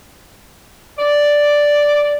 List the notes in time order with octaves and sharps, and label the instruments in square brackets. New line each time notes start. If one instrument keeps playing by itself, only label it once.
[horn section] D5